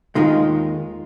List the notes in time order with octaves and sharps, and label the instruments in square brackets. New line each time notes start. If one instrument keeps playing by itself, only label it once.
[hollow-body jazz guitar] D#2 D#3 G#3 D#4 F4